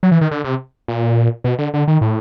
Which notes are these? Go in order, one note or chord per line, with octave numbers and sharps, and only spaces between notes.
F#3
E3
D#3
D3
C3
A#2
B2
D3
D3
D#3
A2